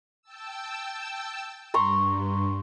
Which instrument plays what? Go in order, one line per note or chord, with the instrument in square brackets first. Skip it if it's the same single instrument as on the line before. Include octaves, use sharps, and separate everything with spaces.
[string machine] G5 A5 E6
[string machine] G2 [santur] A#5 C6 C#6